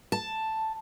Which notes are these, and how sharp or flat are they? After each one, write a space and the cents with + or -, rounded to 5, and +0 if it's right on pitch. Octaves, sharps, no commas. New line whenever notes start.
A5 +5